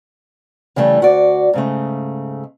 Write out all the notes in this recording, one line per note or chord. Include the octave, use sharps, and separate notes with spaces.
C#3 E3 G3 A3
D2 F#4 D5
G#2 C#3 A3